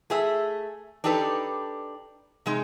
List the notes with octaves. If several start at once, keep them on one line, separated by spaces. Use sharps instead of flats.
A3 G#4 E5
D4 D#4 G4 A4 B4
C3 G#3 D#4